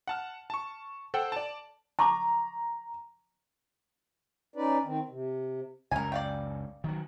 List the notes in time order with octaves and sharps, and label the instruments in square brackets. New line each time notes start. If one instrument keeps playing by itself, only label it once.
[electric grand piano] F#5 A5 F6
A5 C#6
A4 C5 F#5 G5
D5 A5
[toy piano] A5 C#6 D6 [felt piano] A#5
[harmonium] C#4 D#4 B4 D5
D#3 C4
C3
[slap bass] C#2 F#2 [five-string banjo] A#4 G#5
[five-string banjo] D5 F5 G5
[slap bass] D#3 F#3